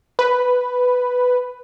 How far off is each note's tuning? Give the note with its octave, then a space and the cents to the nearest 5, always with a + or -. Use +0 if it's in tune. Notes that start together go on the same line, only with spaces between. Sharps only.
B4 +5